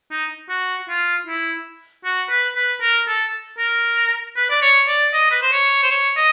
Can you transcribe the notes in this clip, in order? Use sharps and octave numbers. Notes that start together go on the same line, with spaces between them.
D#4
F#4
F4
E4
F#4
B4
B4
A#4
A4
A#4
B4
D5
C#5
D5
D#5
B4
C5
C#5
C5
C#5
D#5